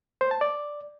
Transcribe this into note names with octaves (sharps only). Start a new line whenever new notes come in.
C5
A5
D5